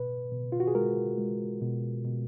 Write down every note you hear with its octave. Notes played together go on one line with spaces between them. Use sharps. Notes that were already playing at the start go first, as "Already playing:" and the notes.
Already playing: B2 B4
B2
F4
F#4
G#4
G#3 A#4
G#3
B2
B2